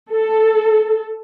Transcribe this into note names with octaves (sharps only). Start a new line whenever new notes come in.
A4